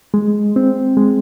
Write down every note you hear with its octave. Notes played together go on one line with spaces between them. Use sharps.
G#3
C4
G#3